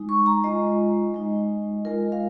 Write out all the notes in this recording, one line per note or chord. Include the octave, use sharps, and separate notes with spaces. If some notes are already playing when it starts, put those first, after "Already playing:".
Already playing: G#3 D#4
C#6
A#5
G#3 F4 D#5
G#3 D#4
G#3 F4 A#4
F5